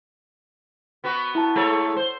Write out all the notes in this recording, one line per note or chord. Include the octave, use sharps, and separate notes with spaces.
B3 F#4 B4
E4 A5
G#3 A4 C#5
C5